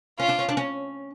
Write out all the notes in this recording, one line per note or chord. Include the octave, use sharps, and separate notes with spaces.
C#4 F4
D4
C#4
D4
C#4